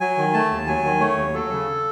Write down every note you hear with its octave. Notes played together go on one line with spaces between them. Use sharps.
F#3 G#5
D#3
A3 A5
D#2
F#3 G#5
D#3
A3 C#5
D#2
F#3 A4
C#3